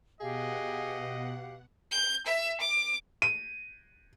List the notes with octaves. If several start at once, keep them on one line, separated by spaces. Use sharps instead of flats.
B2 G4 G#4 D#5 F5 F#5
G6
E5
D6
D#7